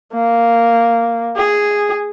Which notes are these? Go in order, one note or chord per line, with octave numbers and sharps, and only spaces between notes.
A#3
G#4